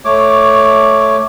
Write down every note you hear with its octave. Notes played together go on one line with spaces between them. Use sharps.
A3 C#5 D6